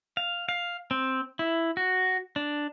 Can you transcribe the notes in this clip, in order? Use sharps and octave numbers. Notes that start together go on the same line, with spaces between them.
F5
F5
C4
E4
F#4
D4